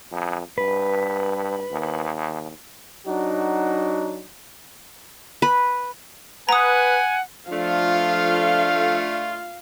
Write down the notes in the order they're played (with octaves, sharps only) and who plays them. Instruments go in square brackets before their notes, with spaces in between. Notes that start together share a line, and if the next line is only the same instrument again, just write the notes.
[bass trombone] F2
[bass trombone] G2 [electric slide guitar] B4
[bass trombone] D#2
[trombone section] F#3 D4 D#4 F#4
[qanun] B4
[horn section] B4 [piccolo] F#5 [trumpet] G#5 [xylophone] A#5 D#6
[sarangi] F3 [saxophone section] A3 D4 [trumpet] F4 [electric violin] F5